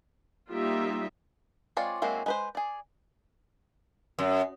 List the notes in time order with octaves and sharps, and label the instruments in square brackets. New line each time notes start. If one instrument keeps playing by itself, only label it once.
[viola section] G3 A#3 D#4 F4 G4 E5
[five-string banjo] G#3 C4 F4 C#5 D5
F#3 G#3 A#3 C4 E4
G#3 B4 C5
G#4 D5
[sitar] F#2